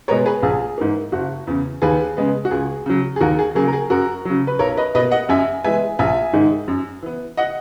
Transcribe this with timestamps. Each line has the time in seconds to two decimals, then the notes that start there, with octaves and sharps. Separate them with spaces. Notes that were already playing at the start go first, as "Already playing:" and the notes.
0.08 B2 G#3 B3 A#4 C#5
0.26 G#4 B4
0.43 A#1 G#4
0.78 G#2 E3 A#3
1.12 F#1 F#4
1.47 E2 C#3
1.82 D#2 G#4 B4
2.17 C#3 G#3 B3
2.45 F#4
2.51 C#2 G#4
2.86 C#3 F#3
3.16 G#4
3.20 D#2 F#4 A#4
3.39 G#4
3.55 C#3 F#3 A#3 G#4
3.68 A#4
3.73 G#4
3.90 F#2 F#4 A#4
4.25 C#3 F#3
4.47 B4
4.59 B1 A#4 C#5
4.77 B4 D#5
4.95 B2 B4 D#5
4.98 A#3
5.11 D#5 F#5
5.29 F#2 E5 G#5
5.64 E3 G#3 B3 E5 G#5
5.99 A#1 E5 G#5
6.33 G#2 D#3 G#3
6.68 F#2
7.02 E3 B3
7.37 D#5 F#5